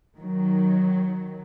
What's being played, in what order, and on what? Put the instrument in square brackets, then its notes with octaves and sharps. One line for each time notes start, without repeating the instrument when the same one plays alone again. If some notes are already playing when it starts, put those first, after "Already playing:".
[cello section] D#3 F#3